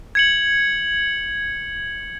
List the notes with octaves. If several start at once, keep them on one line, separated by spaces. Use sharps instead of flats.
G#6 C#7 F#7